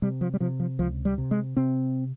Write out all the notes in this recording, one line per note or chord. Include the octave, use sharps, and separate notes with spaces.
C3 G3
F3
G3
C3 F3
F3
C#2 F3
G3
C3
G#3
C3 C4